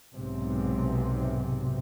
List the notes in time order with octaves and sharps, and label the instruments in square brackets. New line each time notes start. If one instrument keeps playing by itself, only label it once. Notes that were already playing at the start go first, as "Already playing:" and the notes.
[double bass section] B1 G#2 C3